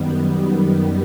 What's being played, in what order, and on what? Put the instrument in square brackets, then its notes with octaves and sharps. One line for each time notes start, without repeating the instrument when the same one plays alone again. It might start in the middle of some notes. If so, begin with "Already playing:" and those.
Already playing: [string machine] F#2 D#3 G3 B3